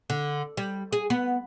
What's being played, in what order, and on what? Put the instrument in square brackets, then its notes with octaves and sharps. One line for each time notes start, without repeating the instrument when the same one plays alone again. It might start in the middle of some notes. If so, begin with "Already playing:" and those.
[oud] D3
G3
G#4
B3